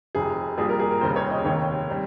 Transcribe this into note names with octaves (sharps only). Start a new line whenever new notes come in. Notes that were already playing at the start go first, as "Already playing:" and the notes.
F1 F2 C3 G#4
A#1 A#2 G3 G#4
A#4
G#4
A#4
F1 D#2 C#3 G3 C4 C5
C#5
D#5
F1 D#2 D#3 C#5
G3 C4